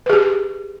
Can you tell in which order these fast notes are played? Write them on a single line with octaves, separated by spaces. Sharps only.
B4 G#4 G4